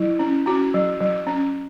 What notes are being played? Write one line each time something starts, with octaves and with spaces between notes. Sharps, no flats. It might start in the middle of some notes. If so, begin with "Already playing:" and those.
Already playing: F#3 E4
C#4
C#4 F#4
F#3
F#3
C#4